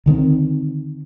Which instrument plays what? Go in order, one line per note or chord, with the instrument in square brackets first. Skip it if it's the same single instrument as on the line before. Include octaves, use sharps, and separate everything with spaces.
[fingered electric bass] D3 D#3 B3 C4